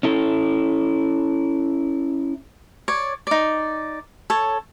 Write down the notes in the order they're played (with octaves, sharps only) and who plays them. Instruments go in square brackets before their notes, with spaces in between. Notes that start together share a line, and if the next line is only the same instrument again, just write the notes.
[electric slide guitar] C#4 E4 A4
[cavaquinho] C#5 D5
D#4 D5
A4 C#5